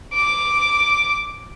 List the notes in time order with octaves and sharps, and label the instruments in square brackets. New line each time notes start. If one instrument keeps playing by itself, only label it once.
[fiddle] D6